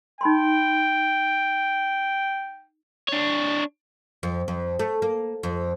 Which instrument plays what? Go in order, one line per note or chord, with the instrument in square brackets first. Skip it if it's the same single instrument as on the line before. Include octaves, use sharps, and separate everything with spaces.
[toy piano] D#4 B5 C6 [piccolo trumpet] G5
[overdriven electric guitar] D4 C#5
[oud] F2
F2
A3
A#3
F2